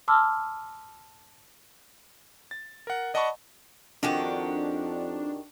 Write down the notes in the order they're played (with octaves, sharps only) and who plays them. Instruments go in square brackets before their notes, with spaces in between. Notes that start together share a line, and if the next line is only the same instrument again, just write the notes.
[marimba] A5 C6 D6 E6 F6
[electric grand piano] A6
A#4 F#5
D5 D#5 F#5 A5 B5 C#6
[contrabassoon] F2 [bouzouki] D#3 F#4 G4 [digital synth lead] D4